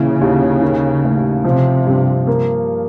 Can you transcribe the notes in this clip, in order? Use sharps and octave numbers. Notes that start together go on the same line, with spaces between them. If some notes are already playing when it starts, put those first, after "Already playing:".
Already playing: A#2 C#3 E3
D#2
D#3
A1
C3 F3
G2
A#3